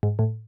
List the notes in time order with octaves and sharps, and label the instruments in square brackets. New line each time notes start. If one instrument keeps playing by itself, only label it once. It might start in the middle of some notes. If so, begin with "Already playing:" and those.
[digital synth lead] G#2
A2